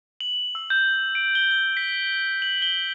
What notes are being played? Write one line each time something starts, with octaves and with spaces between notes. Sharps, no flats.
F#7
E6
G6
D7
G7
G7
B6
F#7
G7